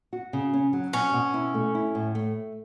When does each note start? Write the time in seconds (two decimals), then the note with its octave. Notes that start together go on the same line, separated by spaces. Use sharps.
0.13 F#4
0.33 C#3
0.53 C#4
0.73 F#3
0.93 B2 C#4
1.14 B2
1.34 E4
1.54 A3
1.75 E4
1.95 A2
2.15 A3